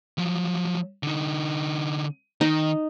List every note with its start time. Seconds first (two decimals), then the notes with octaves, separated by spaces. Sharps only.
0.18 F3 F#3
1.03 D3 D#4
2.41 D#3 D#4